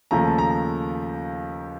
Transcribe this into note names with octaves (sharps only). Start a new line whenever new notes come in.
D#2 C#3 F3 A3 A#5
A5
A#5